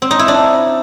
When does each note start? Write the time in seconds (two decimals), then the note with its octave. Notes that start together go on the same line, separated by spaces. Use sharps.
0.02 C4
0.11 D#4
0.19 E4
0.28 D4